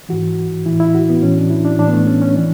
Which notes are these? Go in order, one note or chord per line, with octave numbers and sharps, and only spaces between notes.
G#2 E3 F#4
A2 E3 E4
E4
F#4
B3
A2 E3 C#4
D4
E4
D4
A2 E3 D4
B3
A3
C#4
C#4
E3 D4